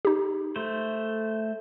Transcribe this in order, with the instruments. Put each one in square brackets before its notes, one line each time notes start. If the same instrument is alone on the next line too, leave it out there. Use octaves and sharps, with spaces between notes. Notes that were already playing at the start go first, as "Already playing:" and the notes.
[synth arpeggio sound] D#4 G4
[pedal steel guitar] A3 C5